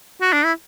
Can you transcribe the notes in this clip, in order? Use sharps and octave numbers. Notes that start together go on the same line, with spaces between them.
F#4
D4
E4